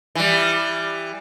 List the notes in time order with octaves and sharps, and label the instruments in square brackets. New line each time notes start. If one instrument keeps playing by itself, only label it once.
[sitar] E3 G3